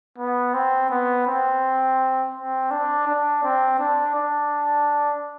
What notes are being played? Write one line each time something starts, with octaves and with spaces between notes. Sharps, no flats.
B3
C4
B3
C4
C4
D4
D4
C4
D4
D4